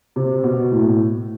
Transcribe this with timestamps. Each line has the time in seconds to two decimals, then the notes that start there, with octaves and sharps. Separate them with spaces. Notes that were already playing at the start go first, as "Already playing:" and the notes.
0.16 C3
0.44 B2
0.72 A2